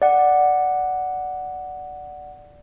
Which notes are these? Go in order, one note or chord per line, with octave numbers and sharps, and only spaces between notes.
D5 F#5